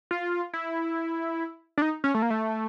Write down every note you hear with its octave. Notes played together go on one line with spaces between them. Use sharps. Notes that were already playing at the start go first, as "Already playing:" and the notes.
F4
E4
D4
D#4
C#4
A3
A#3
A3